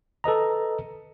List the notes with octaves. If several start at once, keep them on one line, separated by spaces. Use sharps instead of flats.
A4 B4 D#5 A#5